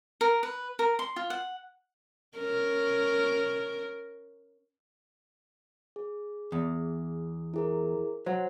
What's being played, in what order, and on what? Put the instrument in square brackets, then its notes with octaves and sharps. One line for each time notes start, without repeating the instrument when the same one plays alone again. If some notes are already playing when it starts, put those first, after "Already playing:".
[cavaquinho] A#4
B4
A#4
C6
F4
F#5
[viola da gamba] C#4 A#4
[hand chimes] G#4
[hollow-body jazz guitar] E2
[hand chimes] E4 G#4 A#4
[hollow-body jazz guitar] F#3 [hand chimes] C5 F#5